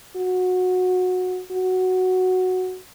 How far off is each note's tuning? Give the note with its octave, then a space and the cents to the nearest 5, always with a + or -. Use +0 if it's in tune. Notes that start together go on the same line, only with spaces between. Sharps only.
F#4 -15
F#4 +0